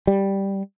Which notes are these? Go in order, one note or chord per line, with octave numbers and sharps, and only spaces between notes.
G3